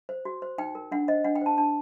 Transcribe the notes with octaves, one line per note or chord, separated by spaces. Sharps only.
C5
F#4
C5
D#4 G5
A#4
D4 F#5
C5 D#5
D4 F#5
G5
C5 A5
D4 A5